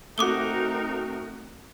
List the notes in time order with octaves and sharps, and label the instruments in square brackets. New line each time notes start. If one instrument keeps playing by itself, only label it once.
[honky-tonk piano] A3 F#4 [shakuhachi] C4 [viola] D#4 A#4 [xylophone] D6 D#6 G7